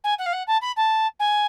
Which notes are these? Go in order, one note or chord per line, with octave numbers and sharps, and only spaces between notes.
G#5
F#5
F5
F#5
A5
B5
A5
G#5